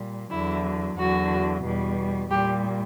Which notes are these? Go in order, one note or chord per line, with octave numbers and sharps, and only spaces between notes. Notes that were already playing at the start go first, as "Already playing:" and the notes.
Already playing: A#2 G3
E2 D3 F#3 E4
E2 D3 F#3 F#4
E2 B2 G3
A#2 G3 G4